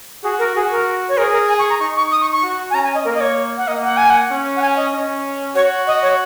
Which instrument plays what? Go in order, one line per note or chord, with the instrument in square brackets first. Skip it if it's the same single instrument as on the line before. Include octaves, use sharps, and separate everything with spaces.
[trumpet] F#4 [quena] G#4
[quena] A#4
[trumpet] F#4 [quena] G#4
[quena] A#4
C#5
[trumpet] G#4 [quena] A#4
[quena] A#4
G#5
C#6
A#5
[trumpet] D#4 [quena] C#6
[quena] C#6
D#6
C#6
C#6
[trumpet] F#4
[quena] G#5
[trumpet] C#4 [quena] A#5
[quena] G#5
D#5
[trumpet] A#3 [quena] A#4
[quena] D#5
C#5
F#5
[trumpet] A#3 [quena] D#5
[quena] F#5
G#5
F#5
[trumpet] C#4
[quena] F#5
G#5
D#5
[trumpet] C#4
[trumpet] F#4 [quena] C#5
[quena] D#5
C#5